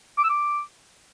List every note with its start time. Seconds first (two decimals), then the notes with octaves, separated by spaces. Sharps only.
0.18 D6
0.24 E6
0.29 D6